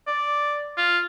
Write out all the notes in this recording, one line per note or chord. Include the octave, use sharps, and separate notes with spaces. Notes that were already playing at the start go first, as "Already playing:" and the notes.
D5
F4